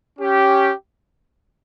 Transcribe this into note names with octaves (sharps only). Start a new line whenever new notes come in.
C#4 G4